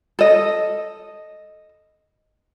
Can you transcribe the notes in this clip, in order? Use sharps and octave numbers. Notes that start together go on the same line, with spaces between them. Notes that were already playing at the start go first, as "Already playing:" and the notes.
A4 D#5